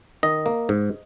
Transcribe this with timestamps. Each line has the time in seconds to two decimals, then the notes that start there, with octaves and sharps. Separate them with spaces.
0.23 D#3 D#5
0.46 A#3
0.69 G#2